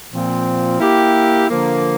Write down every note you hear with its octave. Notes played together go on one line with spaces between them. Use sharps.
A#2 F3 C4
A#3 E4 G4
D3 F3 A#3